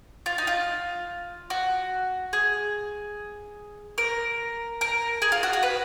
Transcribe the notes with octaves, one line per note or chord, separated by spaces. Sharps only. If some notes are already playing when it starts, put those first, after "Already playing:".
F4
D#4
F4
F#4
G#4
A#4
A#4
G#4
F4
F#4
F#4
B4